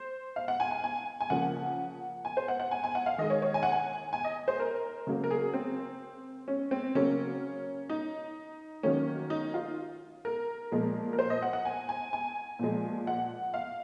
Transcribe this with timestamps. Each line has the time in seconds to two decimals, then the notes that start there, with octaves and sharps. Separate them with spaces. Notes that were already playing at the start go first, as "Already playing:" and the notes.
Already playing: C5
0.36 F5
0.48 F#5
0.60 G#5
0.71 G#5
0.84 G#5
1.21 G#5
1.30 C#3 F3 A#3 F#5
2.25 G#5
2.37 C5
2.48 F#5
2.60 F#5
2.71 G#5
2.84 G#5
2.95 F#5
3.06 F5
3.18 D#3 G#3 D#5
3.30 C#5
3.42 C#5
3.54 G#5
3.63 F#5
3.72 G#5
4.13 G#5
4.24 D#5
4.48 C5
4.60 A#4
5.07 C#3 F#3 A#3
5.24 A#4
5.31 G#4
5.54 C4
6.48 C#4
6.71 C4
6.95 C#3 F#3 A#3 C#4
7.89 D#4
8.83 D#3 F#3 A#3 C#4
9.30 D#4
9.54 F4
10.25 A#4
10.72 A#2 F3 G#3
11.13 A#4
11.19 C5
11.30 D#5
11.42 F#5
11.53 F#5
11.65 G#5
11.89 G#5
12.13 G#5
12.59 A#2 F3 G#3
13.07 F#5
13.54 F5